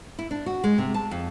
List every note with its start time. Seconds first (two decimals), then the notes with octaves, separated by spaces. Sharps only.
0.19 E4
0.31 D4
0.46 F#4
0.64 G#3
0.78 C3
0.94 A5
1.11 F2